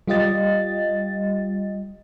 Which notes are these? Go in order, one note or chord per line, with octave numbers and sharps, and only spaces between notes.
G3 F4 G4 D#5 A6